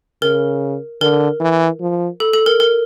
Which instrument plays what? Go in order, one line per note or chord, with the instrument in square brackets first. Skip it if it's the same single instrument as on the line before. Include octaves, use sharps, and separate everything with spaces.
[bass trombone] C#3 [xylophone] A#4
[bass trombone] D3 [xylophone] A#4
[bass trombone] E3
F3
[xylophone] A4
A4
A#4
A#4